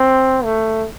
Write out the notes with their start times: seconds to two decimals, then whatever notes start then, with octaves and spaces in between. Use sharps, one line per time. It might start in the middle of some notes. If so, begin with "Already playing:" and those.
Already playing: C4
0.44 A3